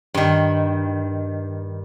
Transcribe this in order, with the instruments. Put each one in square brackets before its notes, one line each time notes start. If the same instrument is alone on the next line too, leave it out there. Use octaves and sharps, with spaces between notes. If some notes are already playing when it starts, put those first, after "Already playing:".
[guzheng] G2 D#3